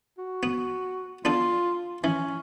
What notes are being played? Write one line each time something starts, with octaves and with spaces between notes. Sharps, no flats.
F#4
B3
B3 D4 F4 A4
E3 C#4